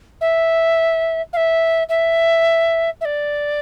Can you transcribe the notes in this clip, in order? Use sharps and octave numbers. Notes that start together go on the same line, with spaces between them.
E5
F5
E5
E5
E5
D5